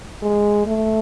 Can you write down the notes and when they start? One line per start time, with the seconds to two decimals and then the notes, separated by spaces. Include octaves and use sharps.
0.22 G#3
0.66 A3